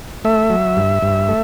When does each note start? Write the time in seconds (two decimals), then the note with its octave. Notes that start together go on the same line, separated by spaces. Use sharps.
0.25 A3 E5
0.50 F#3
0.77 G2
1.02 G2
1.28 A3